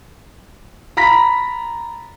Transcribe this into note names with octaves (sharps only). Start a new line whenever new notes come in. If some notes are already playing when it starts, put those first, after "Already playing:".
A#5 B5 A#6 B6